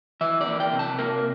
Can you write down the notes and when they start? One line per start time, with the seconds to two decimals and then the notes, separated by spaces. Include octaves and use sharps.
0.21 E3 E5
0.41 D5
0.46 A#3
0.60 G5
0.72 C3
0.79 A5
0.99 A#3 A#4